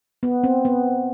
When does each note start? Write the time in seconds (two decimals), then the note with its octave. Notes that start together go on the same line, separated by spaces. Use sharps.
0.23 B3
0.44 C4
0.65 B3